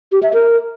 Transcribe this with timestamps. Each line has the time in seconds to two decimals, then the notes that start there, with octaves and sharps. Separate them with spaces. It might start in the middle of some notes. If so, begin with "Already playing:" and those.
0.12 G4
0.23 E5
0.34 A#4